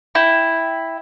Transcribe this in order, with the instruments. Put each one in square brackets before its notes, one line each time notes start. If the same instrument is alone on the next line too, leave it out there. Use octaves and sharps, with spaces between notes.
[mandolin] E4 G5